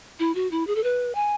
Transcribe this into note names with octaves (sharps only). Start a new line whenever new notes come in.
E4
F#4
E4
G#4
A4
B4
G#5